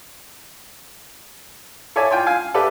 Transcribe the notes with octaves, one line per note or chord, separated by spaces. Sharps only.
A4 C#5 D5 E5 G#5 A5
F4 G5 G#5 C6
F5 G#5
G4 A4 B4 D5 E5